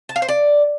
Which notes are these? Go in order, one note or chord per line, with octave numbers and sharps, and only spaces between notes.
A5
F5
C5
D5